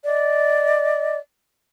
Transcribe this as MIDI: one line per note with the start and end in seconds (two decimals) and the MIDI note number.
0.04 1.16 74
0.04 1.16 75